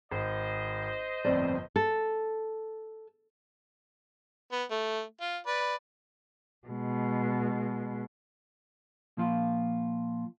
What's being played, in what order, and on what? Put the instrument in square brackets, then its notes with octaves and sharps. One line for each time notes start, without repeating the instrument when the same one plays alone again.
[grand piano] G#1 [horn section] C5 D#5
[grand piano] G1 F2 A2 [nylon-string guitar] C4 D5
[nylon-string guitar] A4
[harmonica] B3
A3
F4
B4 D5
[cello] B2 G#3
[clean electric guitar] A#2 F3 F4